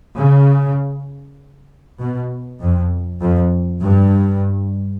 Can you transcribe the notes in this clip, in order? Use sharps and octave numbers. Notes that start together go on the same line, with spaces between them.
C#3
B2
F2
F2
G2